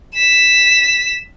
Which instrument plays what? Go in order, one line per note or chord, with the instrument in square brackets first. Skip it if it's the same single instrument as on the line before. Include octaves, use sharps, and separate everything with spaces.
[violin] B6 E7